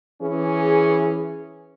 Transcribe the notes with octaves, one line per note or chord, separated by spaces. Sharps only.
E3 C#4 G#4